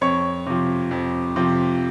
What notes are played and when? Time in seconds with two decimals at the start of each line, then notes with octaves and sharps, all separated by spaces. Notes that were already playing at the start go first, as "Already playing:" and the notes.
0.01 F2 C#5 C#6
0.46 C3 F3
0.91 F2
1.36 C3 F3